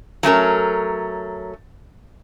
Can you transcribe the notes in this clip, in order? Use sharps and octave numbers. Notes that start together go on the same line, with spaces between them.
F#3 A3 C#4 A#4